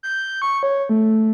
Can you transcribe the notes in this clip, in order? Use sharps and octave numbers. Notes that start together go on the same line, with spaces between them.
G6
C#6
C#5
A3